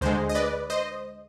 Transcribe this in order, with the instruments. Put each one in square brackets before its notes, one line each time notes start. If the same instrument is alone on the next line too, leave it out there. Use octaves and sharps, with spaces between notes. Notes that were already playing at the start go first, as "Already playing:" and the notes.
[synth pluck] D2 D3 G#3 C5
D#5
B4 D5
C5 D#5